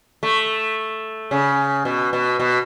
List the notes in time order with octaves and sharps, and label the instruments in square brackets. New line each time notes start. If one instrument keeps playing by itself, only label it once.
[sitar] A3
C#3
B2
B2
B2